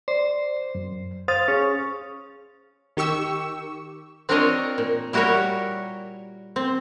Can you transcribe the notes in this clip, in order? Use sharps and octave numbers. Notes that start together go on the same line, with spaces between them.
C5 D5
F#2
C5 F5 D#6 A6
C#4 G#4
D#3 G4 C#6 E6
C4 D4 F4 A#4 C#5 D#5
A#2
G3 E4 F#4 G4 A#4 C#5
C4